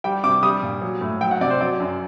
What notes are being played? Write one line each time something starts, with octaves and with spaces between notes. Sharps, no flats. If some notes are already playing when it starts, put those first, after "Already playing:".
G3 G5
C3 D6
G3 D#6
A#2
F#3
A2
F#3 G5
F#5
C3 D5
C5
F#3 D5
F#2